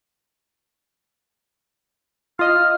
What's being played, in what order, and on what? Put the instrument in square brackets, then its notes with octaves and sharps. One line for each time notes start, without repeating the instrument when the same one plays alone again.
[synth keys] F4 D#5 [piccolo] F6